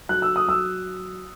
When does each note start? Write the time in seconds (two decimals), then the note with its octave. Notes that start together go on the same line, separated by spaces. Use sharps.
0.09 F#3 F#6
0.22 E6
0.36 D#6
0.47 F#3 E6